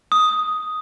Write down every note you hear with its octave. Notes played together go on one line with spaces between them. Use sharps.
D#6